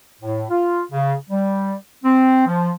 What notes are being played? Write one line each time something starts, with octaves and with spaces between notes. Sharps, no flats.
A2
F4
C#3
G3
C4
F3